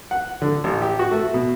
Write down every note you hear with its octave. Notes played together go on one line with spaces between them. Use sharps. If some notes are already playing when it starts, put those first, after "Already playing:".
F#5
D3
A1
G4
F#4
A3
B2